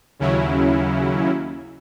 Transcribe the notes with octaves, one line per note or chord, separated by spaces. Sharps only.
D#2 C#3 F#3 C#4 E4